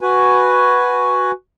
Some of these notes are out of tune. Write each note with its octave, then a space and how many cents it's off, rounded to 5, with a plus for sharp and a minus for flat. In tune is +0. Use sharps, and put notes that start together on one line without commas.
F#4 +0 B4 +0 G#5 +0